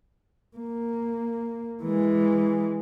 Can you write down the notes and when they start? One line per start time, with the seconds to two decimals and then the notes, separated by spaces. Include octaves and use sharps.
0.57 A#3
1.83 E3 G#3